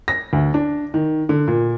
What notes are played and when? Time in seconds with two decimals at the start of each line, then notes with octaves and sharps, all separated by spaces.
0.08 A#6
0.33 D2
0.54 D4
0.94 D#3
1.29 D3
1.48 A#2